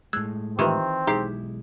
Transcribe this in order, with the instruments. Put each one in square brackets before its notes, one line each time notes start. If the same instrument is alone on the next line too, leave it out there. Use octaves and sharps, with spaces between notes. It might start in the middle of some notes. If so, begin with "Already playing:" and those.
[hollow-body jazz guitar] A2 G#3 [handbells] E6 F#6 G#6
[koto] D#3 E3 [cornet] C4 [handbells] F4 G4
[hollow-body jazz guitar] B1 G#3 E4 [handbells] D#4 G#4 C7 [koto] G4